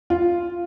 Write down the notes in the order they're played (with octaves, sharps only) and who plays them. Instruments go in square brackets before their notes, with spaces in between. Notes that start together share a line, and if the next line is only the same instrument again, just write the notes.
[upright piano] F4